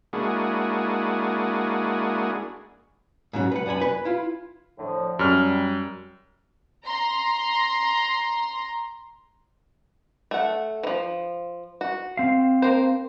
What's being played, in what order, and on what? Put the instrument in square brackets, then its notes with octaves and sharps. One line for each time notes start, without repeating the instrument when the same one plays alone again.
[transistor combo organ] G#3 A#3 D4 E4 F#4 G#4
[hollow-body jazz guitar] G#2 C#3 F#3
B4 F#5
F#2 D5 F#5 G#5 B5
B4
E4 F4
[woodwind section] A2 D3 F3
[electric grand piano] F#2 F6 [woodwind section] G3
[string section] A#5 C6
[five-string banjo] A3 F#5
E3 F3
F#4
[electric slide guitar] C4 F5
[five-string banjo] A#3 C5